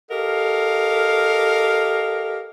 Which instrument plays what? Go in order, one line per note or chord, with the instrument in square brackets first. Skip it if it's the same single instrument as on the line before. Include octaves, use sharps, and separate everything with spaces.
[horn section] G4 A4 A#4 D#5 F5